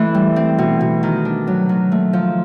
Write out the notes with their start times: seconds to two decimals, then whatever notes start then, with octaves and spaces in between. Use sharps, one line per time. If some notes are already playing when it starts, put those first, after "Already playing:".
Already playing: E3 A3
0.14 G3
0.36 C4
0.58 B2
0.81 B2
1.03 D#3
1.25 D4
1.47 F#3
1.69 D#3
1.92 A3
2.13 F3